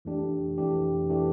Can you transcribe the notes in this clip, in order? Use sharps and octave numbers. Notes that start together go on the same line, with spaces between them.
F2 E3 A3 D4 G4
F2 E3 A3 D4 G4
E3 A3 D4 G4